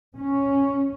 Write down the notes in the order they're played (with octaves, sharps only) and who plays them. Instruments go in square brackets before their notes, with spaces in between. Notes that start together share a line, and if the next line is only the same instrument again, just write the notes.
[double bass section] C#4